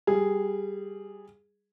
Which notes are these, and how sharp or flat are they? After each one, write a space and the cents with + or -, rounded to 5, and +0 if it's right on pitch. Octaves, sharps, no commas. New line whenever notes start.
G3 +0 G#4 -5